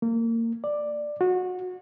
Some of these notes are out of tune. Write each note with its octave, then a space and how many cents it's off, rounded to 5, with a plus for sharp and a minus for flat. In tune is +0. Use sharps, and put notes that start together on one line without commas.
A#3 -25
D5 +10
F#4 -25